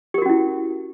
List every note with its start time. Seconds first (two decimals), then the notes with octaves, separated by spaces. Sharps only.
0.14 G4
0.18 A#4
0.22 F#4
0.26 C#4
0.29 E4